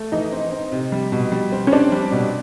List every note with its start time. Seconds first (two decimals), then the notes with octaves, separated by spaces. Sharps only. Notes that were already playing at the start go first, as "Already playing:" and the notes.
Already playing: A3
0.12 E3 D#4
0.32 C4
0.52 C4
0.72 C3
0.92 G3
1.12 B2
1.32 G3
1.52 C4
1.67 C#4
1.72 C4 D4
1.92 G3
2.12 B2